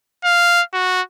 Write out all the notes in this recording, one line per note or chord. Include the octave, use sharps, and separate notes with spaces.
F5
F#4